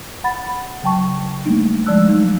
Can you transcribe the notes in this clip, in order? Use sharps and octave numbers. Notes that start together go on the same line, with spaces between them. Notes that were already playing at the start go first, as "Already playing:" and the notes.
F#5 B5 A6
C#3 F#3 G5 A5 C#6
G3 A3 A#3 D4 D#4
F3 G#3 D5 A5 E6 F#6
F#3 G3 D#4